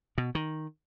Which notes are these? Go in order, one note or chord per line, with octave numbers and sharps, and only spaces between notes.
B2
D#3